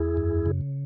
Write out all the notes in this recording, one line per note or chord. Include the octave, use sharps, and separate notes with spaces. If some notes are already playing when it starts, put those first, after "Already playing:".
Already playing: E2 E4 G#4
F#2
C#3